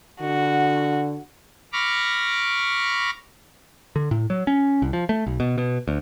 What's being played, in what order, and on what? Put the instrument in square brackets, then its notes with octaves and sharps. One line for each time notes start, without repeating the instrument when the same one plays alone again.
[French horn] D3 [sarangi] F#4
[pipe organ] B5 C#6 D6 F6 A#6
[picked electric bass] D3
A2
F#3
C#4
C2
F3
A3
B1
B2
B2
D2